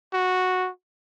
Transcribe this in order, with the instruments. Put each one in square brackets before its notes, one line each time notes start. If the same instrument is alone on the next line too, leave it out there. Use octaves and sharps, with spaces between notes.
[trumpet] F#4